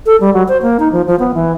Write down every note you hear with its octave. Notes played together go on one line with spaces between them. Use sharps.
A4
G3
F#3
C5
A#3
D#4
F3
F3
B3
E3